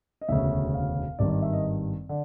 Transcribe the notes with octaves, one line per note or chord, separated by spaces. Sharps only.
D#5
E1 D2 C#3 E5
F5
G#1 G2 D#3 D5
D5
E5
D#5
D3